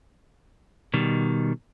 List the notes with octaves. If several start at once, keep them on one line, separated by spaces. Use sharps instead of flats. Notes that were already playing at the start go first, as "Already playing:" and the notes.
B2 D#3 G3